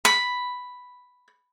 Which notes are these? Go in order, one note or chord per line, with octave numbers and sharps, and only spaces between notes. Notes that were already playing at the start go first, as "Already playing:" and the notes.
B5